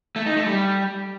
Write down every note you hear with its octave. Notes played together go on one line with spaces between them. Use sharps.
A3
D#4
A3
G3